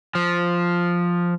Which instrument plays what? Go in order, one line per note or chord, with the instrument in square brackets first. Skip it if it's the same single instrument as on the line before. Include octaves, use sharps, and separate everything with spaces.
[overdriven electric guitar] F3